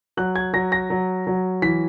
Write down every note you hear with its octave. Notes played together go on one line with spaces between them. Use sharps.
F#3 F#6
G#6
F#3 A#6
A#6
F#3
F#3
E3 B6